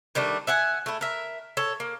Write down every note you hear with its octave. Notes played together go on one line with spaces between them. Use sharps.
D#3 G3 A3 D4
E5 F#5 G#5
A3 E4
A#4 E5
A4 C#5
A#3